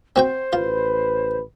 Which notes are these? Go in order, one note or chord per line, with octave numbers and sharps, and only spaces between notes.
C4 F#4 C5 G5
A1 F4 B4